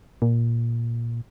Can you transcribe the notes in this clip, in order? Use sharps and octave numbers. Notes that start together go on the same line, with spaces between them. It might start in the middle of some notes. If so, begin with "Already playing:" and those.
A#2